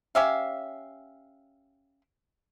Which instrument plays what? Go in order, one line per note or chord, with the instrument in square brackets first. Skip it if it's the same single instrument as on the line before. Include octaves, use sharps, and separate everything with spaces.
[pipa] C#4 G4 E5 F5